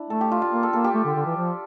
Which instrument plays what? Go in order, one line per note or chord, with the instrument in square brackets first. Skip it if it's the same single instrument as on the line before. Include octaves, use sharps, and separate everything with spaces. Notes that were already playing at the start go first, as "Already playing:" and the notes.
Already playing: [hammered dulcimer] D4 E4
[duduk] A3 [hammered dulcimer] A4
[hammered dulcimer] G4
F4
F4
[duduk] A#3
[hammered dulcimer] A4
[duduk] A#3 [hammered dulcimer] A4
[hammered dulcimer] G4
[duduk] A3
D3
D3
E3
F3